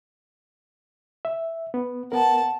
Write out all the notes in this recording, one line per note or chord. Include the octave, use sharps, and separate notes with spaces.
E5
B3
B3 A#4 F#5 A5